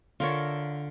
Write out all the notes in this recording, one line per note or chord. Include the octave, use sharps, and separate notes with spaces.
D3 F4 A#4 C#5 E5